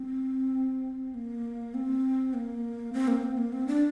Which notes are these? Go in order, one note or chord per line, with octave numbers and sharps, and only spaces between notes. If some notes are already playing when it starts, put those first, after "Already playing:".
Already playing: C4
A#3
C4
A#3
C4
A#3
C4
A#3
C4
D4